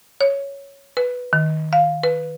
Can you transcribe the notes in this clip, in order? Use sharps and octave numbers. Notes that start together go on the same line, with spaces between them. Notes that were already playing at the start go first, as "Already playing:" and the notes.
C#5
B4
D#3
F5
B4